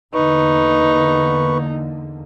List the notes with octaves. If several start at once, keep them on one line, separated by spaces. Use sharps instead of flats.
E2 D3 A#3 D#4 B4 C#6